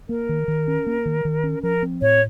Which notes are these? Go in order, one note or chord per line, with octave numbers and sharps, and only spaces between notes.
A#3 A#4
D#3
D#3
C#4
A#3
D#3
D#3
C#4
F3 A#4
C4
A2 C#5